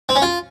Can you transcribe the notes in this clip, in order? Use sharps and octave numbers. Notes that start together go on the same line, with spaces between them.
C4
C#4
F4